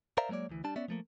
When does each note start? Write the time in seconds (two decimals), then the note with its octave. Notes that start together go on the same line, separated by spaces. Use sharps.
0.17 A#4 C5 D5 E5 F5 A#5
0.29 F#3 G#3 A#3 C#5 D5
0.49 D2 E3
0.64 G3 D4 A5
0.76 B3 C#4 D5 E5
0.88 F3 A3 A#3